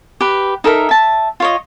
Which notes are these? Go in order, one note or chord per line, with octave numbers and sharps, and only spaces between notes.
G4 B4
D#4 A4 A#4 E5
E5 A5
F4 C#5 D#5